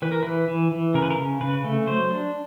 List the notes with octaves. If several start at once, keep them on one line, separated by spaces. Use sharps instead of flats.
E3 B4
A#4
E3 B4
E3
E3
C#3 A#4
B4
A#4
C#3
C#3 B4
A3
F#3 C5
D4